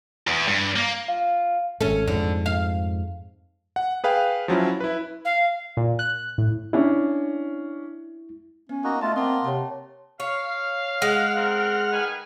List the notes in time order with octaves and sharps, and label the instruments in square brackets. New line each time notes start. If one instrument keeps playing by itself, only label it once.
[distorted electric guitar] E2
G2
A#3
[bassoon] F4
[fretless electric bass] G#1 A3 [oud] C#4 A4
[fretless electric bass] F2 G#2 [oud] D3
[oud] F5
[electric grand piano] F#5
G#4 B4 F5 G5
F3 F#3 C#4 E4
E4 B4
[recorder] F5
[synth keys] A#2
F#6
A2
[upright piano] C#4 D4 [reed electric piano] E4
[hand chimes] B3 [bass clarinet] C#4
[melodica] A#3 D#4 F#4
[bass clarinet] A3 [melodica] F4 A5 [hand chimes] D#5
[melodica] A#3 C6 [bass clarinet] C4 [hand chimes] F#5 A5 D#6
[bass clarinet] C3 [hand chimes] C#5 G5 A5
[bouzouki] C#5 [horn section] F5
[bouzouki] G#3 [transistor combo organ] F#5 F6
[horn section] C4 A#4
D#3 B4 G#5